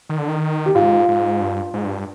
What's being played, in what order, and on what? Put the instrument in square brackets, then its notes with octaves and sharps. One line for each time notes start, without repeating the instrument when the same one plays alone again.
[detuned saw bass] D#3
D3
D#3
[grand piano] G4
[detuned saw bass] G#2 [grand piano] F4
[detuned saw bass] G#2
G2
G#2
G2